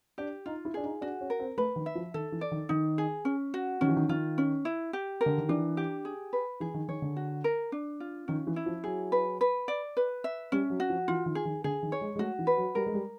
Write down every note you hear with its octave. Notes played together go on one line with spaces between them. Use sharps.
D4 G4
D#4 F4
E4
D4 G#4
D#4
D4 F#4
C#4
A#4
C4
A3 B4
D#3
E5
F3
D#3 A4
E3
D5
D#3
D#3 D#4
G#4
C#4
F#4
D#3 C#4
E3
D#3
D#3 F4
C#4
E4
G4
A#4
D3
D#3
E3 D4
G4
G#4
B4
E3 G#4
D#3
D#3 C#5
D3
F#4
A#4
D4
F4
D#3 C#4
E3
E4
F3
F#3 G#4
B4
B4
D5
B4
E5
G3 C#4
F#3
F#4
F3
E3 F4
D#3
G#4
D#3
D3 G#4
D#3
C#5
G#3
G#3
A3 F#4
E3
B4
F#3
G3 A#4
G#3
G3